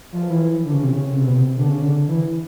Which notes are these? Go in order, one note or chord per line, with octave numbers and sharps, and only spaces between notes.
F3
E3
D3
C#3
C3
C#3
C3
B2
C3
D3
C#3
D3
E3